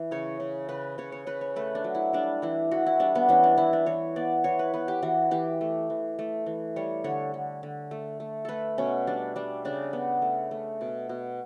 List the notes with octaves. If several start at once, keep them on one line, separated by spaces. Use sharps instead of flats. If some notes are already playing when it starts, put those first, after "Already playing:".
Already playing: E3
C#3 C#5
C#3
C#3 B4
C#3 C#5
C#5
C#3 B4
C#5
A3 B4
D4
F#3
E4
G3 D4
E3 E4
E3 F#4
E4
G3 D4
B3
E3 C#4
D4
E3 E4
D4
E3 C#5
B3 D5
E3 C#5
B4
B3 B4
G4
E3 F#4
E3 G4
A3
E3
A3
E3
G3 C#5
D3 C#5
D3
D3
A3
A3
A3 A4 B4
B2 C#4
G3 D4
G3 D4
C#3 D4
B3
A3
A3
B2
B2